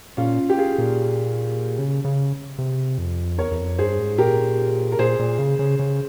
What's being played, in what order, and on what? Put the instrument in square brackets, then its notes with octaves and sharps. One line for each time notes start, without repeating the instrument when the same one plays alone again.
[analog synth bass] A#2 [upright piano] C#4 F4
[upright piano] G4
F4 G#4
[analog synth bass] A#2
C#3
C#3
C3
F2
[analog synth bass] E2 [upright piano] A#4 C#5
[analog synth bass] E2
F2
[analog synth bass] G2 [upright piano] G#4 C5
[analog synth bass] G#2
[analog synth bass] A#2 [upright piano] G4 A#4
[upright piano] A#4
[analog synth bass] A#2 [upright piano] G#4 C5
[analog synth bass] A#2
C#3
C#3
C#3